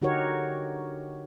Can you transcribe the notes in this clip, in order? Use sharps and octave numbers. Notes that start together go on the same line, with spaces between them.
D3 D#4 F#4 G4 A#4 C#5